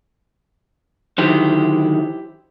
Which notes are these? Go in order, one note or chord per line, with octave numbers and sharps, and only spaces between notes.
D3 D#3 F#3 E4 G4 C5